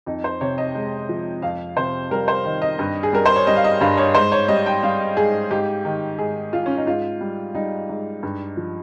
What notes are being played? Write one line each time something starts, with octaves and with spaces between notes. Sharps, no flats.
F2 D#4
C5
C3 C#5
D#5
G#3
F3
F2 F5
C3 C5
G3 A#4
C5
D#3
D#5
G2
G#4
G3 A#4
C5
C#5
G3 D#5
F5
D#5
G2 F5
C#5
G#2 C5
C#5
G3 D#5
G5
G3 F5
G#2 G#4
G#2 G4
D#3
G#2 G#4
G#3 F4
C#4
D#4
G#2 F4
G3
G3 D#4
G#2
G2
F3